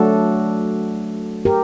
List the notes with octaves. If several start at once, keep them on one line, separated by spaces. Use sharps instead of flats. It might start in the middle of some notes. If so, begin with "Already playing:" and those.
Already playing: F#3 A3 D4 F#4 A4
G4 A#4